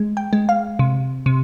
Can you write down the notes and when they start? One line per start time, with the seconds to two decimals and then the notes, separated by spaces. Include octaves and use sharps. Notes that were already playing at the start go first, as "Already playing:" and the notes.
Already playing: G#3
0.17 G5
0.33 G#3
0.49 F5
0.79 C3
1.26 C3